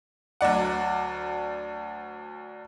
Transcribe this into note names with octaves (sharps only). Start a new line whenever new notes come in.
D2 F#3 D5 F#5